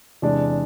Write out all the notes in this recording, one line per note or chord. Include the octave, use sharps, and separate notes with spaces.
E2 C3 G#3 D4